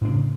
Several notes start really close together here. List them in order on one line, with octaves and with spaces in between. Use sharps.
A2 D4 C#3